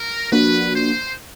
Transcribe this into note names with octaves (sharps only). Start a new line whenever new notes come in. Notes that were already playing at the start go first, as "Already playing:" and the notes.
Already playing: A#4
F3 A#3 D4 F#4 B4
C5